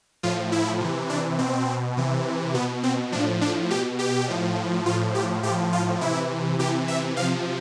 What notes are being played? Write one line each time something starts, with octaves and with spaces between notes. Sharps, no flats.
A2 F3 F4
E4
C3 E3
D4
B2 C4
C3 E3
B2 B3
C4
A2 F3 D4
D4
B2 G4
G4
A2 F3
A2 F3 F4
G4
A2 F3 G4
F4
C3 E3 E4
C3 E3 G4
E5
C3 F3 F5